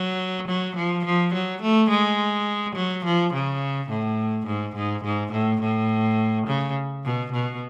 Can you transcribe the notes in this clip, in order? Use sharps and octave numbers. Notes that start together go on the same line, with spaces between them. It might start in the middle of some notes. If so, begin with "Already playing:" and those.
Already playing: F#3
F#3
F3
F3
F#3
A3
G#3
F#3
F3
C#3
A2
G#2
G#2
G#2
A2
A2
C#3
B2
B2